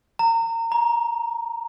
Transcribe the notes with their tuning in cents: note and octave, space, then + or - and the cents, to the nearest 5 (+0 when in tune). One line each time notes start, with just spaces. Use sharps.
A#5 -30
A#5 +20